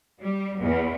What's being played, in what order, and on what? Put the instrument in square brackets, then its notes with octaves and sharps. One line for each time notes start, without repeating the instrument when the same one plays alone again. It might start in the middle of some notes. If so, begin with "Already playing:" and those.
[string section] G3
E2